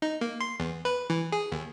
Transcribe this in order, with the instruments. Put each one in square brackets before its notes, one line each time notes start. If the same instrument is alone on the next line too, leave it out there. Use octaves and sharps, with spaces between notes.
[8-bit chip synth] D#4
A#3
C6
E2
B4
E3
G#4
D#2